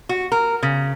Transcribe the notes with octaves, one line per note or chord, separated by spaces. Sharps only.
F#4
A#4
C#3